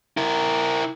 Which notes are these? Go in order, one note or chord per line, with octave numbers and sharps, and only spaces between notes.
E4 A#4